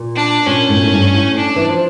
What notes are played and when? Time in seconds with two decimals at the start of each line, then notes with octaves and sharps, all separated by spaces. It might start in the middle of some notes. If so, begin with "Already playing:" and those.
Already playing: A#2
0.16 D4
0.46 A#2 C#4
0.69 A2
0.76 A#2
0.84 A2
0.92 G2
1.14 A2
1.37 D4
1.56 E3
1.68 F3